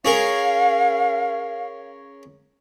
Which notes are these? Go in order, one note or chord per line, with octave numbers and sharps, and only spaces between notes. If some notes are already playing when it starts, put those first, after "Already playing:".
C#4 G#4 A#4 F5